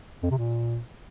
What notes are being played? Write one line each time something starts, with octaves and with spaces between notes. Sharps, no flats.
F2
C3
A#2